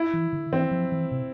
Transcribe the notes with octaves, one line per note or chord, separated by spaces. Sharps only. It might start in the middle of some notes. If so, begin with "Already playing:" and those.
Already playing: E4
E3
D3
E3 C4
F3
E3
C3